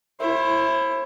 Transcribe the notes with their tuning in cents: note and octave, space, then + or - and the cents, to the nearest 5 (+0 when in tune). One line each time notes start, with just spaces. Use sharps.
E4 +15 C5 +45